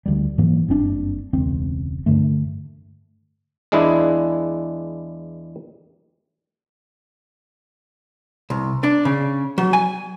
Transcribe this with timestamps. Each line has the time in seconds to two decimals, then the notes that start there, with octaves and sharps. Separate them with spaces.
0.06 D2 G3
0.38 G#2 E3 F#3 A#3
0.68 F#1 G2 C4 D4
1.33 E1 C#2 C4
2.06 G2 D3 A3
3.72 E2 G#3 D4 E4 G#4 B4
8.50 C2
8.83 D4
9.05 C#3
9.58 F#3
9.73 G#5